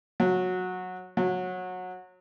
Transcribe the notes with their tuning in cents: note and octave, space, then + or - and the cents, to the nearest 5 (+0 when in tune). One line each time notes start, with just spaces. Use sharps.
F#3 -15
F#3 -20